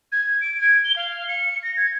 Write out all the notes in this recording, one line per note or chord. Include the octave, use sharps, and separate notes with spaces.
G#6
D7
G#6
G7
F5
C#7
A#6
G#6